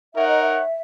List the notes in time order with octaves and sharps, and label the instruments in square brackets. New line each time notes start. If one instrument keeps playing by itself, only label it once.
[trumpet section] D#4 A#4 C#5 F#5 [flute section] E5
[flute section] D#5
E5